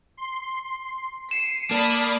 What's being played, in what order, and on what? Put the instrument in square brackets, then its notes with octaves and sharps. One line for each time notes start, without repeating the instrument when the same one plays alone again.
[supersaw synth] C6
[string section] C7 [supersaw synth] C#7 D#7 [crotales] E7
[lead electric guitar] A#3 [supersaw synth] D5 [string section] A5 B5 D#6